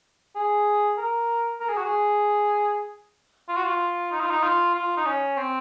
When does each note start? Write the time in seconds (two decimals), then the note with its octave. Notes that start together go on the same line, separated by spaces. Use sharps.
0.36 G#4
0.98 A#4
1.60 A#4
1.69 G#4
1.77 F#4
1.85 G#4
3.49 F4
3.56 F#4
3.64 F4
4.12 D#4
4.21 F4
4.30 D#4
4.43 F4
4.75 F4
4.97 D#4
5.06 C#4
5.37 C4